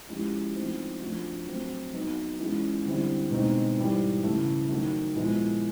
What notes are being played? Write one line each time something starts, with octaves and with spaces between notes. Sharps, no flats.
F3 G#3 C#4 E4 G4
F3 A3 C4 D#4
F3 A3 D4 F#4
F#3 A3 C4
F#3 B3 D#4 F#4
E3 G#3 C#4 F4 G#4
D3 G3 C4 E4
B2 G#3 C4 D#4
G#2 E3 G3
C#3 E3 A3
D#3 F#3 A3
A#2 F3 G#3 B3 E4